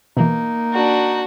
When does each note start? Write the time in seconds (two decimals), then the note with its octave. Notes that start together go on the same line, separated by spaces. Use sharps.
0.17 B2 E3 A#3 D#4
0.73 D4 F#4